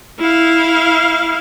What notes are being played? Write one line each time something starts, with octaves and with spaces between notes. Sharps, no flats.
E4 F5